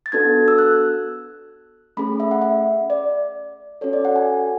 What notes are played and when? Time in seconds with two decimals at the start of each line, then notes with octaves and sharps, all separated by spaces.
0.06 A6
0.12 B3 D4 F#4 A4 G#6
0.48 E6
0.58 F#6
1.97 A3 C#4 G#4 B5
2.20 E5
2.31 F#5
2.42 E5
2.90 D5
3.81 C#4 F#4 A4 C#5
3.93 D5
4.05 F#5
4.16 G#5